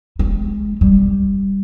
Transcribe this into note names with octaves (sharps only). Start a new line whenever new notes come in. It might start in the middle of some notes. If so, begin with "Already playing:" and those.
G#3
G3